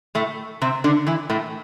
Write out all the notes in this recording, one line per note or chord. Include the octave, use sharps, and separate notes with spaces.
A2 A3
C3 C4
D3 D4
E3 E4
A2 A3